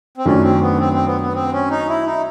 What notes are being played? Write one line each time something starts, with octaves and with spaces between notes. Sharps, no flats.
C4
F#2 D#3 F#3 A3 C#4 D4
C4
B3
C4
C4
B3
B3
C4
C#4
D#4
E4
D#4